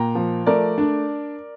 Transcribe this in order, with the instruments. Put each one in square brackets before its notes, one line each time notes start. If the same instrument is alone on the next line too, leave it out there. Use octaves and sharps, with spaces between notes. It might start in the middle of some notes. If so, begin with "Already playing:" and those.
Already playing: [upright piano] A#2 G5 A#5
F3
A3 A#4 D5
D4